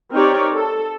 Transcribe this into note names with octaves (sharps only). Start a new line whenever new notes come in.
C4 D#4 G4 A#4 C#5 D5
A4